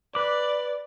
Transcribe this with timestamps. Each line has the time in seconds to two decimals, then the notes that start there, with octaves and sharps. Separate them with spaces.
0.15 B4 D5 D6